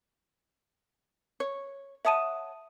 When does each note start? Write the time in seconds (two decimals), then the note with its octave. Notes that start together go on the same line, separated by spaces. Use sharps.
1.40 C#5
2.05 C#5 E5 F#5 A5 D#6 D#7